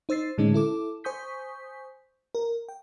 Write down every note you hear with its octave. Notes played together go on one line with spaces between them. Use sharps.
D#4 C5 E6 A6 C7
A2 D3 G#3 C#4 D#4
E4 A4 D6
C5 G#5 C#6 D#6 G6 B6
A#4
G5